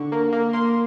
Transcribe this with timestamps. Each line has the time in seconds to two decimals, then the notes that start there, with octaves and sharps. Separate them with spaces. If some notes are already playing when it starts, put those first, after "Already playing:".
Already playing: D3 C#6
0.12 A#3
0.32 A#3
0.53 A#3 C6